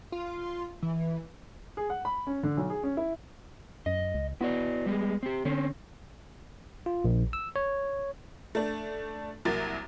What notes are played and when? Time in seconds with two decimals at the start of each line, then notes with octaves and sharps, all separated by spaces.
0.12 F4
0.82 E3
1.77 G#4
1.90 F#5
2.05 B5
2.27 C#4
2.43 D3
2.57 B1
2.70 G#4
2.83 C#4
2.97 E4
3.86 F#2 D#5
4.15 C#2
4.41 B3 E4 F#4 D5
4.86 G3 G#3
5.23 C4 G4
5.45 D3 C4 C#4
6.86 F4
7.04 A#1
7.33 E6
7.56 C#5
8.55 A3 D4
9.45 C2 F#3 A#3 A6